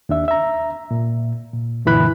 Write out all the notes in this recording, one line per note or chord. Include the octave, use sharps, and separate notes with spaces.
D#2 D4 E5
E5 A#5
A#2
A#2
F#2 A#2 D3 E3 B5 F#6